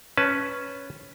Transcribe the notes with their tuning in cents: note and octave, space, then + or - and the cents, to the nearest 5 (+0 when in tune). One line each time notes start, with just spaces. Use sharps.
C#4 +0 B4 +0 A5 -15